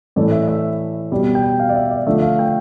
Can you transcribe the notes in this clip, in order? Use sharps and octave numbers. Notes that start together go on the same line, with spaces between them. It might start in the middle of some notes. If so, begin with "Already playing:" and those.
A2 E3 A3 D5
E5
E5
B2 G3 D5
G5
F5
D5
E5
D5
D3 F3 A3 E5
F5
G5